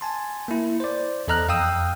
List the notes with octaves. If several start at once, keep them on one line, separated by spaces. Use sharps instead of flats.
G#5 A5 C6
A#3 E4
C5 D5
E2 A4 D#5 A#5 F6 F#6
F2 F5 G5 D#6 E6